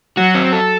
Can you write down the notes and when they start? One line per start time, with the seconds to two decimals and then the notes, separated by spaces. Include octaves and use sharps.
0.17 F#3 F#4
0.35 C4
0.53 A4